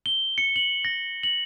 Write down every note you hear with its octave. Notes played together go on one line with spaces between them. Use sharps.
G7
C#7
F#7
A#6
F#7